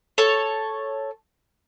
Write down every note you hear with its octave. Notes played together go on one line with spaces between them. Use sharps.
A4 C#5